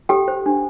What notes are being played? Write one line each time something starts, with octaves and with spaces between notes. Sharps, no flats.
G4 A4 G5
C5
D4